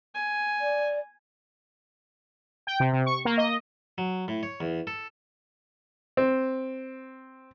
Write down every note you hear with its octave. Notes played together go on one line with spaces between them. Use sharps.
G#5
D5
G5
C3
C3
C#6
A#3
D#5
F#3
A2
C#5
E2
A4
C4